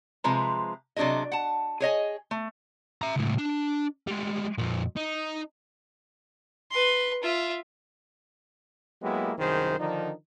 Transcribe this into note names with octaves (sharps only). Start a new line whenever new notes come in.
C3 F3 G#3 B4 A#5
C3 F#3 D4 F#4 G#4 D#5
F#5 A5
G#4 C#5 D#5 G#5
A3
E5 A#5
C#2 A2
D4
G3 G#3
F2 A#2
D#4
B4 C6
F4 E5
F#3 G#3 A#3 B3 E4 G4
C2 F#2 D#3 G#4 C5
D3 D#3 F3 D4 D#4